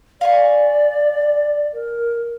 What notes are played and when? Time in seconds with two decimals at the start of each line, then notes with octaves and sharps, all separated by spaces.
0.21 D5 F5 G#5 C#6
1.74 A#4